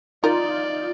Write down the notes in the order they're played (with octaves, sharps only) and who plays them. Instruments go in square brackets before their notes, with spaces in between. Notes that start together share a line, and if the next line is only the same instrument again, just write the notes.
[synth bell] D#4 F4 [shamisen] A#4 [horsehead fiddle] D5